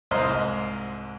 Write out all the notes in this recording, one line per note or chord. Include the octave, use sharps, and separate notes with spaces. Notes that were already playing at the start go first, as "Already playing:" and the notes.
C2 G#2 C5 D#5 F5 A#5